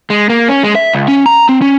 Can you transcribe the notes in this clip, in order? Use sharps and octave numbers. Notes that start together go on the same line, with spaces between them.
G#3
A#3
C#4
G#3
E5
C#2
C#4
A#5
C4
C#4